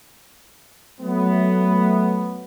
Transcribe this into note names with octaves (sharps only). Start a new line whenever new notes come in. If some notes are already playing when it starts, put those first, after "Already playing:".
F#3 A3 B3